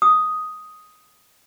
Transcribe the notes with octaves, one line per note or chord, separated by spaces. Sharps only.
D#6